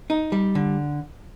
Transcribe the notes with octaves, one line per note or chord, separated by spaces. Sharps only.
D#4
G3
D3